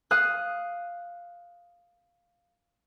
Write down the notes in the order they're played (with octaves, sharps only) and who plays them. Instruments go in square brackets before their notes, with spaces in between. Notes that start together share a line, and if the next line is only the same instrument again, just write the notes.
[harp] F5 D#6 F#6